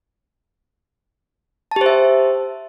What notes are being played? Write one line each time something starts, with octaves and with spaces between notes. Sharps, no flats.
G4 C5 E5 A5